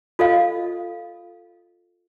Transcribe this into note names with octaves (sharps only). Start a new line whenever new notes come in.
F4 A4 D#5 F5